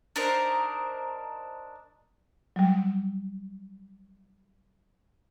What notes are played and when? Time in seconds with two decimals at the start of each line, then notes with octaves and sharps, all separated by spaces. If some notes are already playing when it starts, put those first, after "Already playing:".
0.16 D4 D#4 A#4 C5
2.56 F#3 G3